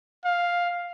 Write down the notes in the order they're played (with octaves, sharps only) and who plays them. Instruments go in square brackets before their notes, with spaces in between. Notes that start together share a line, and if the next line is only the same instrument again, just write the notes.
[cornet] F5